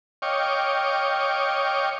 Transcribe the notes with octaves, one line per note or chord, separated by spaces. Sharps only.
C#5 D#5 F5 G5 C#6 D6